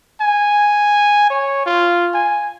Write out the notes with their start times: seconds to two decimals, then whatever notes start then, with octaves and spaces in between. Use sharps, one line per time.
0.21 G#5
1.30 C#5
1.66 F4
2.14 G#5